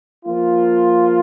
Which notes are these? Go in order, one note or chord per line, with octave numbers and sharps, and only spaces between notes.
F3 A#3 F4